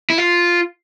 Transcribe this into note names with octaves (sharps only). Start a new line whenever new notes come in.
E4
F4